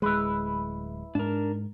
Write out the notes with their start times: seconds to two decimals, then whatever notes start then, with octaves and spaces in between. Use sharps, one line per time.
0.02 D1 G#3 E4 B4
1.15 G#2 D4 A#4